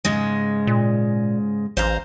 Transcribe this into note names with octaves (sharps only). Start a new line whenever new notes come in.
G#2 C#3 G#3
A#2
A1 C5 F5 A#5